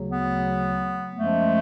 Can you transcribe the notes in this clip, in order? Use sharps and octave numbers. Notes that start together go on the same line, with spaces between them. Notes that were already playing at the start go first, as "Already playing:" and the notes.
Already playing: D2 C#3 F#3
B3
F#2 F3 G#3 A3